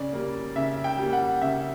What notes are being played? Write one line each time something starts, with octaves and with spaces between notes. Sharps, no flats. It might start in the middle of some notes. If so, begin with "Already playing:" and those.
Already playing: C#3 D5
G3 A#3
C#3 E5
G5
G3 A#3
F#5
C#3 E5